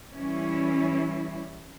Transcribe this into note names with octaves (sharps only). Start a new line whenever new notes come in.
E3 G3 C#4 E4